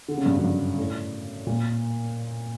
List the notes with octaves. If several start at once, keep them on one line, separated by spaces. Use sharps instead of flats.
D3
C#3
G2
F#2
G2
A2
A#2